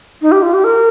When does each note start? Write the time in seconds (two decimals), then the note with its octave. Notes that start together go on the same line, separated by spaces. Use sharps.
0.22 D#4
0.32 G4
0.42 F4
0.54 G4
0.64 A#4